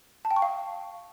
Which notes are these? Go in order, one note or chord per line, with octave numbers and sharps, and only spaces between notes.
A5
G5
C#6
F5